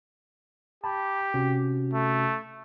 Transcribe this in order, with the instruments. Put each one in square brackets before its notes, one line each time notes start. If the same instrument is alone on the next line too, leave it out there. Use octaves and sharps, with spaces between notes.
[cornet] G4 [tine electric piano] A5 B5
[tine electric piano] C3 C#4 F#4
[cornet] A3